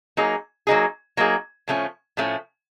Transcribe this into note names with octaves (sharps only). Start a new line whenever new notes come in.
F#3 A#3 D#4 G#4
F#3 A#3 D#4 G#4
F#3 A#3 D#4 G#4
A2 F3 A3 C#4
A2 F3 A3 C#4